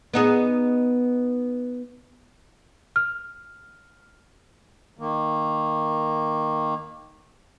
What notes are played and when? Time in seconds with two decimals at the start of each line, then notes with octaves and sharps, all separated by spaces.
0.14 B3 D#4 G#4
2.96 F6
4.99 D#3 A#3